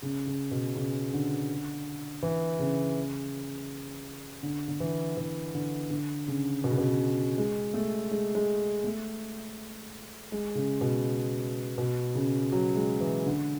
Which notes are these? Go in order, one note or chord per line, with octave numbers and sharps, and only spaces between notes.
C#3
C#3
B2
C#3
D3
E3
C#3
D3
D3
E3
E3
D3
D3
C#3
B2
C#3
B2
C#3
G#3
A3
G#3
G#3
A3
G#3
C#3
B2
B2
C#3
F#3
G#3
E3
D3